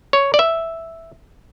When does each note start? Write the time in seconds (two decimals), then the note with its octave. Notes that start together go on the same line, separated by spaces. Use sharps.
0.13 C#5
0.34 D5
0.39 E5